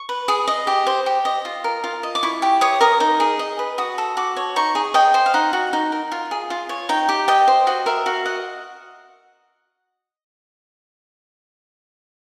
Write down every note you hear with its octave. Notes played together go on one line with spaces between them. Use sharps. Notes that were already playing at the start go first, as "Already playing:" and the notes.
Already playing: C#6
B4
G#4 D#6
D#5
G4
C5
G4
D#5
F4
A#4
F4
D#5
D6
E4 C#6
G4
C#5 D#6
A#4 D#6
D#4
G#4
D#5
B4
F#4 D#6
A4
F#4 D6
C#5
D#4 C#6
G#4
D#5 G5
C5
F5
D#4 F#5
F#4
D#4
A#4
F4
G#4
F4
C#5
D#4 G5
G4
D#5 G5
C5
F#4 D#5
A#4 E5
F#4 F5
D#5 F#5